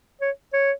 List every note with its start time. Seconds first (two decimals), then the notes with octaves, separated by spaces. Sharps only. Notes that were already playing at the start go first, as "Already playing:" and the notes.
0.21 C#5
0.53 C#5